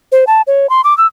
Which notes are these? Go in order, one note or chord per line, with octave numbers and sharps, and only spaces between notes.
C5
A5
C#5
C6
D6
E6